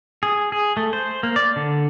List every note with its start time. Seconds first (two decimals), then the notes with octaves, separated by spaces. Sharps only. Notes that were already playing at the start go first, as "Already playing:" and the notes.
0.23 G#4
0.52 G#4
0.77 A3
0.93 C5
1.23 A#3
1.36 D5
1.56 D3